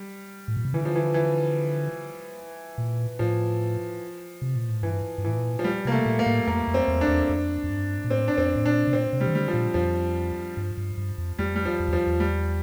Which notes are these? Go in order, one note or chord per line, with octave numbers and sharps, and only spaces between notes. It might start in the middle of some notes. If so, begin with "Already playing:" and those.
Already playing: G3
A2
A#2
C3
D3 E3
F3
E3
E3
A#2
A2 F3
C3
A#2
A2
G2 E3
G2
A2 E3
A#2
F3
G3
C3 A#3
A3
A#2
A#3
A2
F2 A#3
F2
C4
E2
D4
E2
F2
F2
G2
A#2
A2 C4
D4
F2 C4
A2
A#2 D4
C3
A#2 C4
C3
G3
E3
D3 G3
F3
A#2
F2 F3
G2
G2
G2
F2
F2 G3
G3
F3
F2
E2 F3
E2
G3